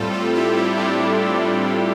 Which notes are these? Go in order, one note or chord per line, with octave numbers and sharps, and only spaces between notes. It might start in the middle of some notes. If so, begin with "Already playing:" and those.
Already playing: A2 G3 C4 F4 A4
A2 G3 C4 F4 A4
E4 G4
E4
A2 G3 C4 D4 F4
A2 G3 C4 E4
D4